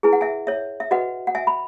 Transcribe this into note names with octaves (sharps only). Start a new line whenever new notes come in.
E4 G#4 B4 G#5
F#5
E5 G#5
C#5 E5
E5
F#4 B4 D#5 F#5
F#5
E5 G#5
B5